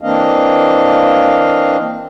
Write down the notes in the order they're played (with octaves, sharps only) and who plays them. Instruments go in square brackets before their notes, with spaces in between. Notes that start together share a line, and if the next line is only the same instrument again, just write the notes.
[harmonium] E3 A#3 C4 D4 D#5 F5